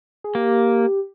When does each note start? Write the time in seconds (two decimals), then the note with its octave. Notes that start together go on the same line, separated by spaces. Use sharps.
0.24 G#4
0.35 A#3 G4